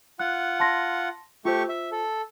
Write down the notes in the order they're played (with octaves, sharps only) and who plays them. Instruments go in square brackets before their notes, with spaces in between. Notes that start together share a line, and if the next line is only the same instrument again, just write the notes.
[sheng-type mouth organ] F4 F#5 [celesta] F#6
[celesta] A5 C6 A#6
[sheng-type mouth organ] A3 G4 C#6 [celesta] F4 C5
[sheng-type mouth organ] E5
A4